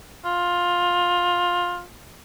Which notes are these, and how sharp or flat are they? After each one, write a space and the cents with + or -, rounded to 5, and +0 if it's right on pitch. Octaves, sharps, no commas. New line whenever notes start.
F4 +15